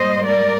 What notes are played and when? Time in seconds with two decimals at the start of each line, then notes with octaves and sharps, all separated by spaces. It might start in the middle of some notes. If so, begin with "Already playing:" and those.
Already playing: G#2 G3 A#3 C5 D#5
0.25 A#4 D5